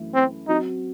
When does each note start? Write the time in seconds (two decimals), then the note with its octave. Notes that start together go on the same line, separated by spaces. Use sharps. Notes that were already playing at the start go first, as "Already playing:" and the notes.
Already playing: F#2 E3 A3
0.15 C4
0.48 F#3 C4 D#4 F#4